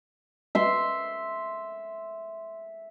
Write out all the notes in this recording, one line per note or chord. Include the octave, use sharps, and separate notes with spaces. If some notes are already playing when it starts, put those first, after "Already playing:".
E5 C6